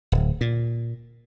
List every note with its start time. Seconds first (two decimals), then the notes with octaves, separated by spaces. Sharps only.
0.12 D1
0.41 A#2